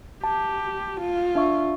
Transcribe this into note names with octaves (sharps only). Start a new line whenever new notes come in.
G4 A5
F4
D4 E5 C#6